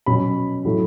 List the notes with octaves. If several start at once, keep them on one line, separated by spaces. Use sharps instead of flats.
B2 F#3 C#4 B5
A2 F#3 A3 E4